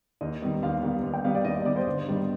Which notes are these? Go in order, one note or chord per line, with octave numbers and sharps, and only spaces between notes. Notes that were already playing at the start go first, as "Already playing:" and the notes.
D#2 D#5
D#3 G3 B3
D#2 F5
D#3 G3 B3 F5
D#2
G5
D#3 G3 B3 F5
D5
D#2 D#5
D#5
D#3 G3 B3 D5
C5
G1
G2 D#3 G3 B3